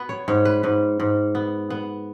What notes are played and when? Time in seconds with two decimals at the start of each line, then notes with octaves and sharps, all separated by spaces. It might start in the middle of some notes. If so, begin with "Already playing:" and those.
Already playing: B3 B4
0.09 C#5
0.28 G#2 C#5
0.45 B4
0.63 G#2 B4
1.00 G#2
1.35 B3
1.70 B3